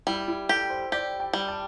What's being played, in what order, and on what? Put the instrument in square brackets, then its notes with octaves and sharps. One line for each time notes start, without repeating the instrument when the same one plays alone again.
[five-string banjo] G3 [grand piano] E4
[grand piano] E4
[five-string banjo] G4 [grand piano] A4
[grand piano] C5
[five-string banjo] G4 [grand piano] D5
[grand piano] G5
[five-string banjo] G3
[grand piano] A5